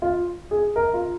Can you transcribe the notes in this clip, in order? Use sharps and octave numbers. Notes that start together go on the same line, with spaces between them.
F4
G#4
A#4
F4